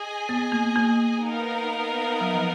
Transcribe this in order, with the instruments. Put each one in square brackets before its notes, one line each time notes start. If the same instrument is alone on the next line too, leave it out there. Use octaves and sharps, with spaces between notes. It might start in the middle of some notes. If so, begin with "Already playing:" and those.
Already playing: [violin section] G#4 D#5 G#5
[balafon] B3
A#3
A#3
[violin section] B3 D#4 A#4 F5
[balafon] F#3
F3